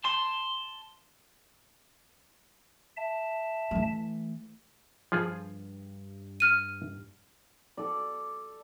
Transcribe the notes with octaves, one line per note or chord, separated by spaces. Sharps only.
A5 C6
E5 A5
E3 A3
G2 F3 F4 G#4
F6 D#7
A4 D5